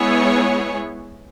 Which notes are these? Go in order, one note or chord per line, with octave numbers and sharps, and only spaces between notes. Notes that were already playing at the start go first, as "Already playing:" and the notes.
Already playing: G#3 B3 E4 G#4 C#5